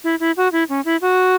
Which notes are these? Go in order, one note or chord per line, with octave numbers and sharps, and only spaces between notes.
E4
E4
F#4
E4
C#4
E4
F#4